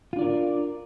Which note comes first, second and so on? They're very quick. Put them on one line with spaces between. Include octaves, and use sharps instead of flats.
F4 D4 D5 A#4